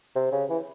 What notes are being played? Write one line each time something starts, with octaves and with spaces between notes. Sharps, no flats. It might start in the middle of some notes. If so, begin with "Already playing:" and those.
C3
C#3
E3